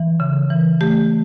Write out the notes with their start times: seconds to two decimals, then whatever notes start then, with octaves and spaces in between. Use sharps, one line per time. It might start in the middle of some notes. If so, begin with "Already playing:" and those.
Already playing: E3
0.20 C#3
0.50 E3
0.81 A3 G4